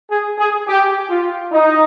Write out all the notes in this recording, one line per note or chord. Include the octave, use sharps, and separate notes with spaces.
G#4
G#4
G4
F4
D#4